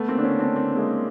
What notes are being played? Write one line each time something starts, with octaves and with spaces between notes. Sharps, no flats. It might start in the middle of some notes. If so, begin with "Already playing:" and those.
Already playing: A3 B3
A#3 C4
D4
B3 C#4
C4 D4
A#3 C4
G#3 A#3